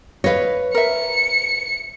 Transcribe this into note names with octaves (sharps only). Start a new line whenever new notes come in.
B4 C#5 D#5 F5
A#4 E5 C#7